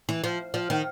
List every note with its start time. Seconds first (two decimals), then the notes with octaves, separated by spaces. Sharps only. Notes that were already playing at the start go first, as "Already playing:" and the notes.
0.09 E3
0.24 F3
0.54 F3
0.70 D#3